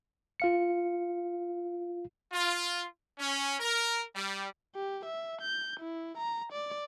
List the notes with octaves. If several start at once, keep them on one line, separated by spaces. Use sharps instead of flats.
F4 F5 C#7
F4
C#4
A#4
G3
G4
E5
G6
E4
A#5
D5